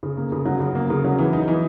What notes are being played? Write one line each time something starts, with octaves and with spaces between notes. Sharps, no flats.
C#3
A#3
C#3
F#3
C#3
A#3
C#3
F#3
E3
D#4
E3